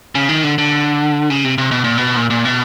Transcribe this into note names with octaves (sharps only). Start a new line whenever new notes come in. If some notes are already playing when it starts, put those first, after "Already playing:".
C#3
D#3
D3
D3
C#3
C3
C3
B2
A#2
B2
A#2
A#2
B2